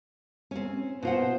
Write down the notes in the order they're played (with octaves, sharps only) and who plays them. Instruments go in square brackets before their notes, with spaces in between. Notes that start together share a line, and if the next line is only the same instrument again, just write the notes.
[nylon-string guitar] C4 C#4
[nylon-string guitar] B2 F4 F#5 [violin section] C5